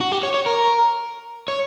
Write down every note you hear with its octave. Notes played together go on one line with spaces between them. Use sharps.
F#4
G4
C#5
C#5
A#4
C#5